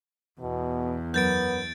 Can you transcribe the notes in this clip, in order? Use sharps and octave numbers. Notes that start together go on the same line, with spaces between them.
E2 B2
F#2 B3 G6 A6 D7